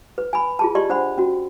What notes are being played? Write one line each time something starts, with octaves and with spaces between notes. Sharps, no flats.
B4
G#5 B5
F4 G#4 A5
G4 D5 D#5 C6
D4 C5 F#5 B5
C#4 F#4